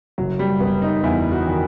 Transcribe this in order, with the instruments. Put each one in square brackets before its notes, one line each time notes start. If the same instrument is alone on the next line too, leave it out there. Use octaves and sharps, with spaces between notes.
[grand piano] F#1 [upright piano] F#3
[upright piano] G3
[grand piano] F#1 [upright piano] B3
[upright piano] D#4
[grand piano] E2 [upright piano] E4
[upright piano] F#4
[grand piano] D#3